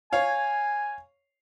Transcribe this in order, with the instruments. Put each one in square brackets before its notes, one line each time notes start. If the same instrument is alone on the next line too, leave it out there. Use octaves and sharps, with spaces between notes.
[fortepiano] C#5 F5 [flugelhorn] G#5